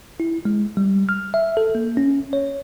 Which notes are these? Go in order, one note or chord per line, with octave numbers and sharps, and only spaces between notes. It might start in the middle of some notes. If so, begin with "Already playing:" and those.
E4
G#3
G3
F6
E5
A4
A#3
C#4
C#5